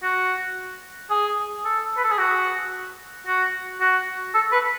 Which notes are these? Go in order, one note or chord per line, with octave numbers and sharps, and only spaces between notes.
F#4
G#4
A4
B4
A4
G#4
F#4
F#4
F#4
A4
B4